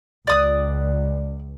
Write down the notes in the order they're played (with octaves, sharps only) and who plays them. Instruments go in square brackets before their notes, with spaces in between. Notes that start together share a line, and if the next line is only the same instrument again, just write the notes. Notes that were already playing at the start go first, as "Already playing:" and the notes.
[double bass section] C#2 [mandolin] D5 D#6 F#6